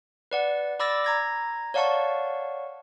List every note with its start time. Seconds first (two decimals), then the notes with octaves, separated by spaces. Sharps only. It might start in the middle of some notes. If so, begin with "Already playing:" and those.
0.31 B4 D5 F#5
0.79 D5 B5 D6 E6 A6 A#6
1.04 A#5 G#6 A#6
1.74 C#5 D5 F5 F#5 A5 C#6